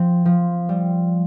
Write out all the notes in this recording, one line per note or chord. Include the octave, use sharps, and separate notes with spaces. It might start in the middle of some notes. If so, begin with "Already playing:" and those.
Already playing: F3 C4
F3
G3